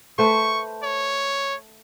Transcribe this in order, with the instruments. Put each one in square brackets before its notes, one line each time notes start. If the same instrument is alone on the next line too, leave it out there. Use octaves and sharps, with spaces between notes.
[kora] A3 B4 C5 [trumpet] C#6
[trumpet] C#5